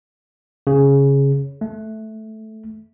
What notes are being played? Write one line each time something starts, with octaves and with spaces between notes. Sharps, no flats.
C#3
A3